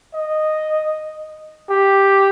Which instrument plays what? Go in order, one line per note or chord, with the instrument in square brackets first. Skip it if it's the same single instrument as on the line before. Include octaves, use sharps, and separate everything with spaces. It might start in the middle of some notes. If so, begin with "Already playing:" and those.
[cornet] D#5
G4